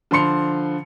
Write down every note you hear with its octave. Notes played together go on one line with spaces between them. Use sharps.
D3 F3 B5 C6 C#7 F7